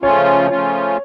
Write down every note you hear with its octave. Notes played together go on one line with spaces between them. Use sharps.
C#3 F3 A3 C#4 F4 C#5
C#3 F3 A3 C#4 F4